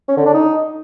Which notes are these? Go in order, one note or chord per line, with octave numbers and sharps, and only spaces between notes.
C#4
D3
D4
D#4